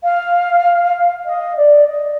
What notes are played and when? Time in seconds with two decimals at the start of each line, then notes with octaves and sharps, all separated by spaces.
0.03 F5
1.25 D#5
1.57 D5
1.87 D#5